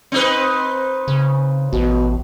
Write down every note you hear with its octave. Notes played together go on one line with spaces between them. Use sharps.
C4 D#4 B4
C#3
A1 B2